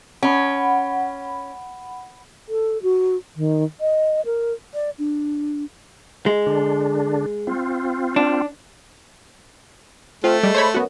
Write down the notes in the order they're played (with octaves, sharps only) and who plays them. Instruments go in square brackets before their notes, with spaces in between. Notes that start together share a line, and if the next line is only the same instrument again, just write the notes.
[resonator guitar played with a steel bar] C#4 [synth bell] F#5 B5
[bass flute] A4
F#4
D#3
D#5
A#4
[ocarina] D5
D4
[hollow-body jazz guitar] G#3
[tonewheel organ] D3 D4
C4 F4
[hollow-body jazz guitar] D4
[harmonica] A3 [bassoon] C4 [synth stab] F4
[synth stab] G3 [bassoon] G#3
[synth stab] C5 C#5 B5
[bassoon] F#2 [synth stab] B3 F#4